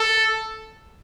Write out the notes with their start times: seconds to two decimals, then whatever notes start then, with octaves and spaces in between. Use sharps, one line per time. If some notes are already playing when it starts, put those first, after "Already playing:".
Already playing: A4